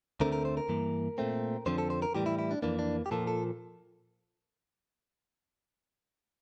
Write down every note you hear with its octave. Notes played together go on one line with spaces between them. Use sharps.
D2 D3 A3 C4 A#4
A#4
C5
A#4
G2 E3 A#3
A#2 A3 C4
F2 D3 F3 C4 C5
A4
C5
A#4
A2 E3 G3 G4
E4
E4
D4
F2 E3 A#3 D4
D4
G4
A#2 F3 A#3 A4
A4